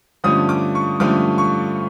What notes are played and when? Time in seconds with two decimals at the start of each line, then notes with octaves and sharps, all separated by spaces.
0.24 G2 D3 F3 A3 C#4 D#6
0.49 D6
0.75 C#6
1.00 G2 D3 F3 A3 C#4 D6
1.38 C#6